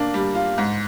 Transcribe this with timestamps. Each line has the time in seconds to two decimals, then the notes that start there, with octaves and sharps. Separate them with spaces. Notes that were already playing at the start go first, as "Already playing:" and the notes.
Already playing: A#3 D4
0.14 G3
0.35 F4
0.58 G#2